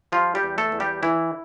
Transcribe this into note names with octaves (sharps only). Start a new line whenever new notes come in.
F3 G3 F4
G3 G4
E2
A3 A4
E2
G3 G4
E3 E4